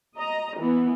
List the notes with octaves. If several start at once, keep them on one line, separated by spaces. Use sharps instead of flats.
D#5 A#5
E3 B3